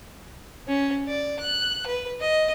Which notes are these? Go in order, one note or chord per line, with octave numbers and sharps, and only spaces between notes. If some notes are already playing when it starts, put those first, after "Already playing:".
C#4
D5
F#6
B4
D#5